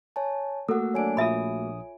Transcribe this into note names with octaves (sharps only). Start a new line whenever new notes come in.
C#5 G#5 A5
A3 A#3 F#4 A4 F#5 E6
F#3 D4 C#5 G#5 D7
A#1 F4 E5 B5 D#6